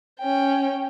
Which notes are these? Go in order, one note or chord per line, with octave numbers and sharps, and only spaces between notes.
C#4 G5